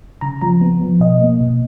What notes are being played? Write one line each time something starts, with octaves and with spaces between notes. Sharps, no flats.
C#3 A#5
F3 A#5
B3
F3
B2 D#5
A#3
B2